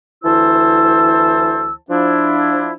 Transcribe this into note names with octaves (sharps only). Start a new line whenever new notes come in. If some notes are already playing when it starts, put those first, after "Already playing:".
D2 E3 E4 C5 A5 E6
F3 D4 E4